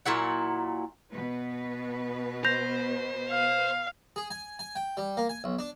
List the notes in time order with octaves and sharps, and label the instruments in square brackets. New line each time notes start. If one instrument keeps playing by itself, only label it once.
[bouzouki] A#2 F#3 E4 F#5
[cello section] B2 B3 B4
[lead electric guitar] C5 [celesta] G6 A#6 F7
[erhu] F5
[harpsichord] G#4
G#5
G#5
G5
G3
A#3
G#5
B1
D4